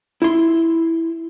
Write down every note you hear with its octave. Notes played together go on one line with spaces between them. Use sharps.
E4 C6